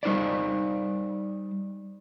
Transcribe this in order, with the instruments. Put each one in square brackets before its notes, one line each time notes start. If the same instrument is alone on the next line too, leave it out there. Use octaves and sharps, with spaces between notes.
[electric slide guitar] G3 D#4 C5 D5